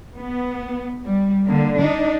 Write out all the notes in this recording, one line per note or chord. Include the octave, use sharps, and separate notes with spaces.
B3
G3
D3 A#3
D4 D#4